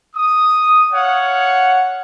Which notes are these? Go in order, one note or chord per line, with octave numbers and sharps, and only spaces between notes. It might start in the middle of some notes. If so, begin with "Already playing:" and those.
D#6
C#5 F5 F#5